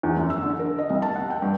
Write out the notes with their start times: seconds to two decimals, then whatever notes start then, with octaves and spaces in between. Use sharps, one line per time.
0.03 E2
0.17 F#2
0.30 E6
0.42 D3
0.59 A#4
0.79 D#5
0.90 C2
1.02 A5
1.15 F#5
1.30 G5
1.42 G2